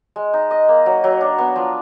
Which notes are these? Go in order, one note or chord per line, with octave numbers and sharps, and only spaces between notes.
G#3
D#4
D#5
A#3
F#3
F#3
D4
B3
F3